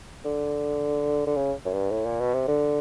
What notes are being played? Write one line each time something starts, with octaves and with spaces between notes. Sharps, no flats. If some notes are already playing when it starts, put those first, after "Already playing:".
D3
D3
C#3
F#2
G2
A2
A#2
B2
C3
D3